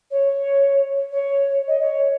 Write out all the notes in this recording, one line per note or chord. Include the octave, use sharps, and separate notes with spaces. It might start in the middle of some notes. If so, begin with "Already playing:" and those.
C#5
C#5
D#5
C#5